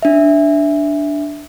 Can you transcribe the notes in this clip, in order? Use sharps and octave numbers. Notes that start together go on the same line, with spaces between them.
D4 E5